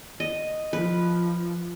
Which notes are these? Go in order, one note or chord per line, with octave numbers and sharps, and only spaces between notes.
D#5
F3 B4